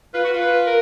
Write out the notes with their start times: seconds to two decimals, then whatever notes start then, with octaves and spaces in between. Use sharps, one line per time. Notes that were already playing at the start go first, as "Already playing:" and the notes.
0.14 F4 B4
0.24 F#4
0.34 F4
0.40 B4
0.67 A#4